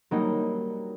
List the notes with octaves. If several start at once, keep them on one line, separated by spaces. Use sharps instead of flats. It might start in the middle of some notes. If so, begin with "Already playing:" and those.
F#3 G3 A#3 D#4